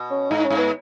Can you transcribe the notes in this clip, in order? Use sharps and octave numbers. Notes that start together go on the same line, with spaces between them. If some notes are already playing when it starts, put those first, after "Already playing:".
Already playing: B2
C#4
G#2 D#4
C#4
G#2
B3